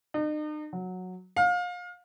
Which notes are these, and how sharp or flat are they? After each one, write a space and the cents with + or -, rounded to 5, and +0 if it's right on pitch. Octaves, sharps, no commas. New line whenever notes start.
D#4 -40
F#3 -10
F5 +30